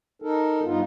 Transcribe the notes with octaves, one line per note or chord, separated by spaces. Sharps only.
D#4 A4 A#4
G2 B3 D#4 F4